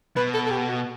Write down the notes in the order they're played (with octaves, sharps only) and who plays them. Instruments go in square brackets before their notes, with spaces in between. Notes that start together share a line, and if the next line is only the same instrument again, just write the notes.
[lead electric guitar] B2 [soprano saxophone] B4
[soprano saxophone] A4
A4
G4
F#4